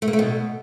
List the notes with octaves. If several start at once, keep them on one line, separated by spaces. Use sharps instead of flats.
A3
A#3
A3
B2